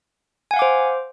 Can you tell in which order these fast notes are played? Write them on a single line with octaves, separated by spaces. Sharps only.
G#5 F#5 F5 D6 C5